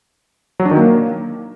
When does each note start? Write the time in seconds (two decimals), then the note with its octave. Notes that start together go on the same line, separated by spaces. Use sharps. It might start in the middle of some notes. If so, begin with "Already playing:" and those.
0.60 F#3
0.65 D4
0.71 D#3
0.77 A#3